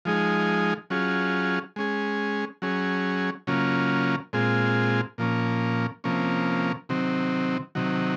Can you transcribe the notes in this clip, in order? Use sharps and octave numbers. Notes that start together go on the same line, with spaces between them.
F3 G#3 D#4 G#4
F#3 C#4 F4 G#4
G#3 C#4 G#4
F#3 C#4 G#4
C#3 F#3 A#3 C#4 F4
A#2 G#3 C4 F4 G#4
A#2 F3 A#3 C#4
C3 F3 A#3 C#4
C3 D#3 F#3 C4
C3 D#3 F#3